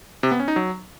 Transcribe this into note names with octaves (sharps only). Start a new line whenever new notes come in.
C3
B3
C#4
D#4
F#3